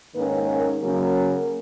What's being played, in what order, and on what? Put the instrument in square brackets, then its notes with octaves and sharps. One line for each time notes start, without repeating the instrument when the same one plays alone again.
[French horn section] G#2 D#3 A#3 C#4 B4
A#4
C#3 F#3 A#3 C#4